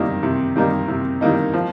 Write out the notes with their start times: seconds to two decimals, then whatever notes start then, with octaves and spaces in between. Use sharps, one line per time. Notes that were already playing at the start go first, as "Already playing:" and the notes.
Already playing: C3 D#3 G3 A#3 D#4
0.23 C3
0.56 D#3 G3 A#3 D#4
0.88 C3
1.21 D#3 G3 A#3 D#4
1.54 F3